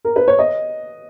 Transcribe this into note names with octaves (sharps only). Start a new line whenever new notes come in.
A#4
B4
C#5
D#5